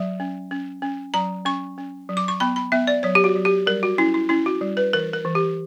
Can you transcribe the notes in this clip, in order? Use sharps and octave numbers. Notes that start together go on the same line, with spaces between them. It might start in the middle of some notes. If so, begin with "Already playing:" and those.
Already playing: F#3 E5
C#4
C#4
C#4
F#3 A#5
C#4 C#6
C#4
F#3
D6
C#6
B3 B5
B5
B3 E5
D5
F#3 C#5
G4
F#4
F#3
G4
G3 A#4
F#4
C#4 E4
E4
C#4 E4
F#4
G3
B4
E3 A#4
A#4
E3
G4